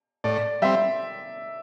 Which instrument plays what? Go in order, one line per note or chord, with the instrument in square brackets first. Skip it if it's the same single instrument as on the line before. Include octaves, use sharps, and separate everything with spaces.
[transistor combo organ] A2 [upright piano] D5
[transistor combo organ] G3 C4 [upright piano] E5